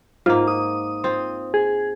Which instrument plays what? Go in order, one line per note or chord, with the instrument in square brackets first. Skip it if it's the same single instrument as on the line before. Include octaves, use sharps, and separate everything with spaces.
[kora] G#2 A#3 [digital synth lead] F4
[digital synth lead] D#6
[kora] C4 F4
[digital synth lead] G#4